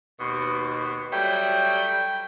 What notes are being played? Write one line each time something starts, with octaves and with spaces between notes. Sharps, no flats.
D#2 B2
F#3 G3 A3 G5